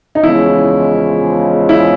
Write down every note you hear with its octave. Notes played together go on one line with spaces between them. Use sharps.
D#4
E2 C#3 F3 G#3 E4
E4